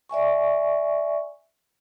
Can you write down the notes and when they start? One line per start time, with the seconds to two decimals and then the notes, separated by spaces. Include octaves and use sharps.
0.09 D5 E5 G#5 C#6